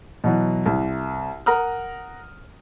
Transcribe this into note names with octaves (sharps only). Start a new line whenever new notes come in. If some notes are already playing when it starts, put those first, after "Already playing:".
B2 E3 F#3
C2
A#4 F#5 A#5 D#6 F6